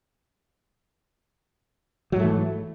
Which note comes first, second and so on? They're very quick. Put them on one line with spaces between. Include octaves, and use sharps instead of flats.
F#3 G#2 A3 E3